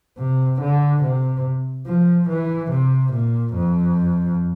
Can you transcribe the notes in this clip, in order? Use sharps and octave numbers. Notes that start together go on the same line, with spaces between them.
C3
D3
C3
F3
E3
C3
A#2
F2